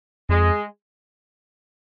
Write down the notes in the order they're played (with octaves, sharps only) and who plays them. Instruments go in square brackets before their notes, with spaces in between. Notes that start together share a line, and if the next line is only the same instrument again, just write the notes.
[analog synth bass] F2 [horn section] G#3